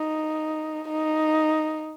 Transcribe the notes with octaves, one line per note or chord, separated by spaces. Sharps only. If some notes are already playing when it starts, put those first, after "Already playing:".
Already playing: D#4
D#4